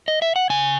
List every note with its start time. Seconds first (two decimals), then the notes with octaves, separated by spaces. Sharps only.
0.08 D#5
0.22 E5
0.36 F#5
0.50 C#3 G#5